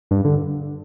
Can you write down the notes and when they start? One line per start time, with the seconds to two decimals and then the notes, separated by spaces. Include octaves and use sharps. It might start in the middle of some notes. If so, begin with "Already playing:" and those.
0.11 G2
0.25 D3